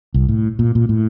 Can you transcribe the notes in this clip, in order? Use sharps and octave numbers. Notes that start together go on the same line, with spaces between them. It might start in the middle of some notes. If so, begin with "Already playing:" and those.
C2
A2
A#2
A#2
A2